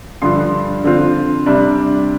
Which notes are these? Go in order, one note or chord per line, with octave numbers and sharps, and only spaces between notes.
G2 D3 F3 C6
D3 F3 C4 F4
C3 G3 D4